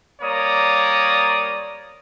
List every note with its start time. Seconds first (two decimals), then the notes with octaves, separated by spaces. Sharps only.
0.22 G3 A#3 C#5 D5 A#5 D#6